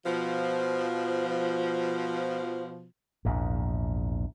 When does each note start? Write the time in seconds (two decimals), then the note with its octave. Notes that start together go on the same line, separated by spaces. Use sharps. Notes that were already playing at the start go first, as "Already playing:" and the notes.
0.05 B2 F3
3.25 A#1 E2 G#2